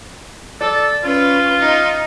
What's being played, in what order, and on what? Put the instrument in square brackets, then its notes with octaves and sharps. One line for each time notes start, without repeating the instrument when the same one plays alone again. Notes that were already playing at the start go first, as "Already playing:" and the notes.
[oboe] A4 [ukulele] D5
[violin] C#4 B4 [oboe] F4
[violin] D#4